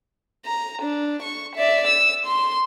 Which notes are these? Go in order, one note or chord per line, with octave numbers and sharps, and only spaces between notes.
A#5
D4
C#6
D5 E5
E6
C6